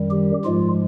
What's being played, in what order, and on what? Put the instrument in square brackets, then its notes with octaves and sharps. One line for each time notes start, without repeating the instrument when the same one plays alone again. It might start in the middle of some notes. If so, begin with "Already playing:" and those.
Already playing: [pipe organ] F#2 D#3 G3
G4
G#2 F3 G#3 F4